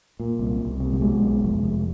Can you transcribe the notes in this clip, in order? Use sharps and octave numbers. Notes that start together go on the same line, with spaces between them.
A#2
C2
C2
C3
G3
B2 G#3
B1
F1
F1